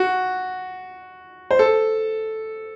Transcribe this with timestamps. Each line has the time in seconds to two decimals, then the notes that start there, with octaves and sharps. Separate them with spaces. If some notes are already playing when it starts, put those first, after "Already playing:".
Already playing: F#4
1.51 C5
1.59 A4